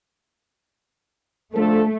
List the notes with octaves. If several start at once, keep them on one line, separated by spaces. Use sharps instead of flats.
D3 F3 A3 A4